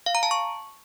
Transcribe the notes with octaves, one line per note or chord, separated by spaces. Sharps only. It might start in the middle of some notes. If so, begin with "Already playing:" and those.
F5
A#5
A5
C#6